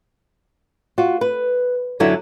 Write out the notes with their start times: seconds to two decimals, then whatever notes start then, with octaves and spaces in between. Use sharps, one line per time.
0.98 F4 F#4
1.21 B4
2.00 F#2 D3 F#3 E4 E5